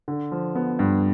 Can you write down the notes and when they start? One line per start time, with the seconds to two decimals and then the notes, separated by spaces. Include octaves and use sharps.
0.08 D3
0.32 F3
0.55 B3
0.79 G2